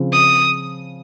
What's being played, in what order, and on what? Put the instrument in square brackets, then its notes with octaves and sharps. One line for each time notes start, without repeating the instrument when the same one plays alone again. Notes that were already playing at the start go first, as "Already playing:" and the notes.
Already playing: [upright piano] C#3 F3 C4
[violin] D#6